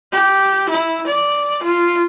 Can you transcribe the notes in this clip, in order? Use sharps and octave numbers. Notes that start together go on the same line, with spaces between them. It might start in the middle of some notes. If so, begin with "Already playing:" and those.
G4
E4
D5
F4